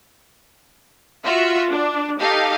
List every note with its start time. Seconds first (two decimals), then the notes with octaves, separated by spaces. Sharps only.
1.24 F4 F#4 E5
1.71 D4
2.21 D#4 G4 A4 F5